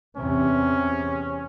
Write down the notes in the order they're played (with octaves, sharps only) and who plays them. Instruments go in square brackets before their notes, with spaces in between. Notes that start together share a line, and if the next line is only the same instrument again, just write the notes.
[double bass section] E2 C3 [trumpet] C#4